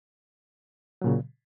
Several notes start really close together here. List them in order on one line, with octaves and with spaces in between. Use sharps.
F#3 A#2 C#3